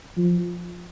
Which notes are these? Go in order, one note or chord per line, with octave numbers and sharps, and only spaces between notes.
F3